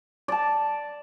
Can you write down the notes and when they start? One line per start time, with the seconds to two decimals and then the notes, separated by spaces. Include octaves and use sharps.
0.28 D5 A5